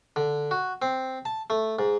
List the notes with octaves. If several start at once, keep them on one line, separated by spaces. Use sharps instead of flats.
D3
F#4
C4
A5
A3
G#2